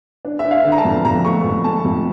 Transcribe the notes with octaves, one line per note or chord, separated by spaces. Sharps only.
D4
E5
D4
F5
D3
A#5
A5
F2
F2 A#5
A3 C#6
F2
A3 A5
F2